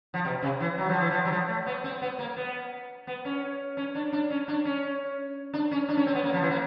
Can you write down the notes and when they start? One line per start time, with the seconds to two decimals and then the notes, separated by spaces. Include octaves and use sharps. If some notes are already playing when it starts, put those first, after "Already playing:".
0.14 F3
0.25 B2
0.43 C3
0.60 E3
0.78 F#3
0.89 F3
1.00 E3
1.10 F3
1.25 F#3
1.31 F3
1.49 A3
1.66 B3
1.84 C4
2.02 B3
2.19 A#3
2.37 B3
3.07 B3
3.25 C#4
3.77 C#4
3.95 D4
4.12 D4
4.30 C#4
4.48 D4
4.65 C#4
5.54 D4
5.71 C#4
5.89 D4
5.97 C#4
6.06 C4
6.15 B3
6.24 A#3
6.33 F3
6.42 E3
6.51 A#3